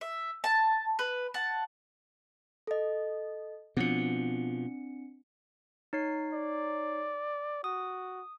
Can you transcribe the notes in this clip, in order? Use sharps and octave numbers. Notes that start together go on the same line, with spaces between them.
E5
A5
B4
F#5 A5
A4 D#5
B2 F3 C4 D4 C#7
D#4 C#5 C7
D5
F#4 D#6